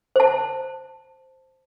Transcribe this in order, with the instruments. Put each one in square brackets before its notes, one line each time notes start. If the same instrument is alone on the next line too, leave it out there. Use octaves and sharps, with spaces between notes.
[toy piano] C5 A5